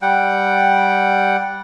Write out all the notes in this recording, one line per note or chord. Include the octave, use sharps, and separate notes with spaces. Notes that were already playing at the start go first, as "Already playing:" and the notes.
G3 F#5 G5